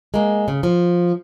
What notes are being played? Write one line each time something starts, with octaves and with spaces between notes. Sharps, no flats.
G#3 A#3
C#3
F3